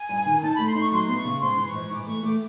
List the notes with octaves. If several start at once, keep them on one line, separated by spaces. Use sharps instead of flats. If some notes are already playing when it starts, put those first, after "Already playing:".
Already playing: G#5
G2
D#3
D#4 A5
A3 B5
C6
D#4 C#6
F#3 C6
B3
C#6
C#3
G#2 C6
E3
C#6
G#2
E3 D6
A3 C#6
A3 D6